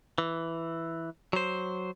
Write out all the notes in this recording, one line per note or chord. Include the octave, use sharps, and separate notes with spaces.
E3
F#3 C5